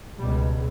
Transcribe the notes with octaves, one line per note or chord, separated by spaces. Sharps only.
C#2 B2 G3